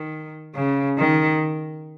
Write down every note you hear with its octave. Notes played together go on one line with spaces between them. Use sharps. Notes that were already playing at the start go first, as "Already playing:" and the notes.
Already playing: D#3
C#3
D#3